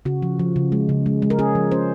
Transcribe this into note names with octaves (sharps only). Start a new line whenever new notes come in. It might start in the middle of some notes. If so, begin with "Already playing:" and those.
C#3 F#4
F3
F3
C#3
G#3
C#3
G#3
G#3
A#4
C#4 G#4
F3
C#4 C5